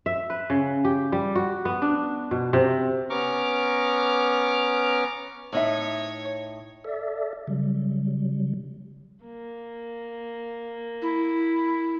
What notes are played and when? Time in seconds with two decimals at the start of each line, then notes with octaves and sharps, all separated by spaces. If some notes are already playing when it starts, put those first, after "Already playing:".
0.06 E5
0.30 B4
0.50 C#3
0.85 G4
1.12 G3
1.35 F#4
1.65 B3
1.82 D4
2.31 B2
2.53 C3
3.10 B3 C#4 A#5 C#6 D6 F6
5.53 A2 D#4 C#5 E5
6.84 A4 D5 E5
7.47 C#3 F#3 G3
9.24 A#3
11.02 E4